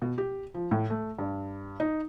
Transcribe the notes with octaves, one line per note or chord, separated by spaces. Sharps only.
B2
G4
F3
A2
A3
G2
D#4